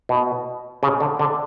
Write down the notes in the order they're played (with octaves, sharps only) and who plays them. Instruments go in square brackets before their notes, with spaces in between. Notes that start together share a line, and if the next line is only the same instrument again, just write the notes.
[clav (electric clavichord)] B2
C#3
D3
D3